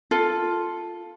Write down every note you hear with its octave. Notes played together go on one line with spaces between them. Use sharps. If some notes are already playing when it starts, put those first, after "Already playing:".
F4 A4